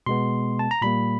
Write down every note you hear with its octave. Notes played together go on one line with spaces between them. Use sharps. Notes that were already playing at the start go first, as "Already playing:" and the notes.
B2 G#3 B3 C6
A5
A#5
A#2 G3 A#3 B5